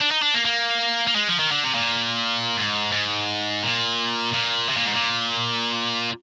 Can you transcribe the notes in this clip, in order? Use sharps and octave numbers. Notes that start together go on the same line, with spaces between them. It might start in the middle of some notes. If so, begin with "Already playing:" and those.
D4
D#4
D4
A#3
A#3
A#3
G#3
F3
D#3
D3
C3
A#2
G#2
G#2
A#2
A#2
C3
A#2
G#2
A#2